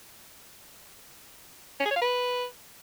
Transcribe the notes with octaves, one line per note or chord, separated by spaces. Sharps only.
C#4
G#4
C#5
F5
B4